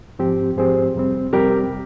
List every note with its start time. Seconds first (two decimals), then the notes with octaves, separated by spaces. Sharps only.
0.19 G#2 F3 C4 G4
0.57 G#2 F3 C4 G4 G#4 C5
0.95 F2 C3 G3 C4
1.33 F2 C3 G3 C4 G4 A#4